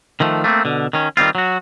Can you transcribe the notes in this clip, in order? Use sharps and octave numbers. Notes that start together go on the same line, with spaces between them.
D#3 F3 A3
A3 A#3 C4
B2 D3
D#3 C#4
D#3 G3 C4 F4
F#3 F#4